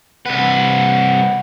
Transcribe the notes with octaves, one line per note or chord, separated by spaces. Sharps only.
C2 B4 F#5